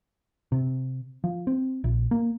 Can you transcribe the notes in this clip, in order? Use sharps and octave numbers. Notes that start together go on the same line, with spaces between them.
C3
F3
C4
A#1
A#3